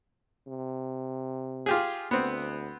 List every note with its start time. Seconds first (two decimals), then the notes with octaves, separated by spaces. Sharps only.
0.47 C3
1.66 F4 G4 G#4
2.11 D2 B3 C4